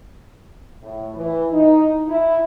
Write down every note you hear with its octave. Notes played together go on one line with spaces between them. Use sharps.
A2
E3
D#4
E4